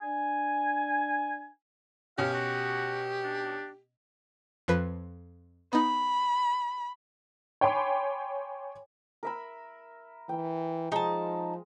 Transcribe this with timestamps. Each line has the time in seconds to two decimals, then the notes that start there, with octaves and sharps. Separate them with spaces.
0.02 D4 G#5
2.18 B2 C#4 G4 F5
2.33 F#4
3.24 D4
4.68 F2 F3 B4
5.73 B3 D#4 B5
7.61 C#5 G5 G#5 B5 C6 D6
9.23 A#4 E5 B5
10.29 E3 G5
10.92 F3 G#3 D#4 A5